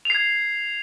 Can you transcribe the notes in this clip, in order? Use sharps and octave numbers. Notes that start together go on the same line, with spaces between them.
G#6 C7 F7